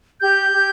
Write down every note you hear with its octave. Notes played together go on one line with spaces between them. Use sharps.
G4 G6
G4